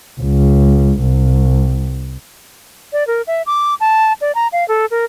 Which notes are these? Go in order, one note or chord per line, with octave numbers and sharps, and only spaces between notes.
C#2
C2
D5
A#4
E5
D6
A5
D5
A#5
F5
A4
A#4